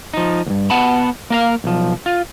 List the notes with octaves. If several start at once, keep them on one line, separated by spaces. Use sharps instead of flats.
F3 D#4
D2 G2
B3 F#5 A5 B5
A#3 A#4 F5
B1 F3
F4